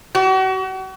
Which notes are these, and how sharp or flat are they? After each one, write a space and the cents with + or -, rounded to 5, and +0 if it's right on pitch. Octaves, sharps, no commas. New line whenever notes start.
F#4 +40